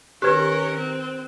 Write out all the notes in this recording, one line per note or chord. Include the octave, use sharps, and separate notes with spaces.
D#3 C#4 G4 A#4 B4 F#6 G#6
C4